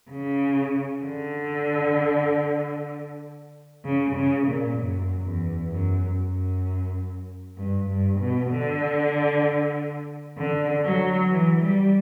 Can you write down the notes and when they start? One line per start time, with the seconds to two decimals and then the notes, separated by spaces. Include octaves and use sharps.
0.11 C#3
1.04 D3
3.85 C#3
4.16 C#3
4.48 A#2
4.79 F#2
5.24 E2
5.71 F#2
6.18 F#2
7.58 G2
7.90 G2
8.20 B2
8.51 D3
10.38 D3
10.86 F#3
11.32 E3
11.63 G3